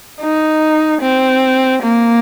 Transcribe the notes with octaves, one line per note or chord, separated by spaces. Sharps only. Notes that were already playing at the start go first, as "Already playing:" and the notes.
D#4
C4
A#3